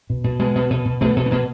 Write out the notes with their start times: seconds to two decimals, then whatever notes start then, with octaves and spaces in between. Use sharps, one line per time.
0.10 B2
0.24 B2
0.39 B2 G#3
0.55 B2
0.70 B2
0.85 B2
1.01 B2 A3
1.16 B2
1.26 B3
1.31 B2 A#3